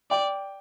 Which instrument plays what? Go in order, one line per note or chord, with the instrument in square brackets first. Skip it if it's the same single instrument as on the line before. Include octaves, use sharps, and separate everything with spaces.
[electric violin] D5 [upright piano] G5